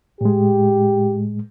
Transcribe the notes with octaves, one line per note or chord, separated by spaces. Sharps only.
A2 G#3 G4